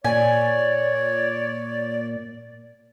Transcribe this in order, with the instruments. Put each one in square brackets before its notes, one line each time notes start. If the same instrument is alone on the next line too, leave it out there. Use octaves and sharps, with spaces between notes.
[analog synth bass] A#2 [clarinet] C#5 [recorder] D5 [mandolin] G#5